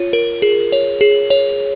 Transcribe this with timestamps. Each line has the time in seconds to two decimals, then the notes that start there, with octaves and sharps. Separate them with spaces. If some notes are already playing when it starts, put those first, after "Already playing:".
Already playing: F4 C#5
0.13 A#4
0.42 G#4
0.72 C#5
1.01 G#4
1.30 C#5